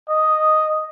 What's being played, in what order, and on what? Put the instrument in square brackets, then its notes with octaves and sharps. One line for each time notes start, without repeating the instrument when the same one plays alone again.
[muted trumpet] D#5